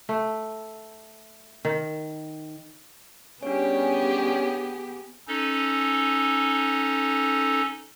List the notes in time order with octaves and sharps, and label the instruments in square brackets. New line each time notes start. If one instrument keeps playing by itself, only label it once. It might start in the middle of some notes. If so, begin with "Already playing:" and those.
[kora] A3
D#3
[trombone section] G3 C#4 [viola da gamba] B3 [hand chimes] D4 C#5 [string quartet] G4 G#4
[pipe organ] C#4 D#4 A4